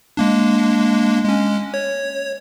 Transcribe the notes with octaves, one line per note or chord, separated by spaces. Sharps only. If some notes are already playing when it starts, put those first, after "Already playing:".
G#3 A#3 D4
G#3 C#4
C#5